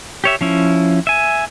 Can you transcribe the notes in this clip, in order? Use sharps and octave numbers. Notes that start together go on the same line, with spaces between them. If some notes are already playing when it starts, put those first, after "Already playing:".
G4 C#5 E5
F3 C#4 E4
E5 G#5